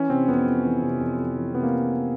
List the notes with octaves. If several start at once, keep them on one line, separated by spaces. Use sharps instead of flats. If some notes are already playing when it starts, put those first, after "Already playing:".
Already playing: E3 C#4
C3 C4
F2 B3
F2
E3
C3
F2
F2
E3
C3 B3
A#3